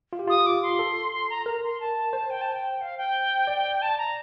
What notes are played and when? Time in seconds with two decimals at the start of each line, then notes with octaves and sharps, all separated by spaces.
0.13 F4
0.19 G4
0.27 F4 D#6
0.46 D6
0.62 C6
0.79 A4
1.12 C6
1.29 A#5
1.46 A#4 A#5
1.63 C6
1.80 A5
2.13 C5 A5
2.30 G5
2.41 A5
2.52 G5
2.80 F5
2.97 G5
3.47 D5
3.81 A5
3.97 A#5